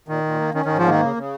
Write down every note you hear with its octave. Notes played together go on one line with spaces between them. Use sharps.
A#2 D#3
A#2
A#3
D#3 C#4
G#2 D#3
F3
D#3 A#3
C#3
C#3